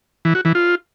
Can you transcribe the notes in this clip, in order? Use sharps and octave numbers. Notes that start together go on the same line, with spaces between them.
E3
F#4
E3
F4